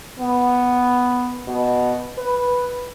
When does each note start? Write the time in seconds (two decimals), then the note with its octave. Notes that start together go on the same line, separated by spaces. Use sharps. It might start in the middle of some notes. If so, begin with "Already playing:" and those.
0.20 B3
1.47 B2
2.18 B4